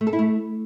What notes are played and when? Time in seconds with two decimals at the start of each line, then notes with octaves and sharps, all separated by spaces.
0.01 A3
0.07 A4
0.13 E4
0.19 A3